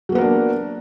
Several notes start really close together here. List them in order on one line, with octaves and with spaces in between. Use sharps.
F#3 A#3 B3 A#4 D4